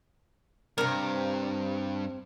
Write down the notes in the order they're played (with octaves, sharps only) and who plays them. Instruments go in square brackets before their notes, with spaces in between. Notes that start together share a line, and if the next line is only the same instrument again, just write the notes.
[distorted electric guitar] G2 [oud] C3 D4 [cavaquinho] A#4